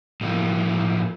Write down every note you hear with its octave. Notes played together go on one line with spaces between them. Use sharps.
A2 E3 F3 A3 A#3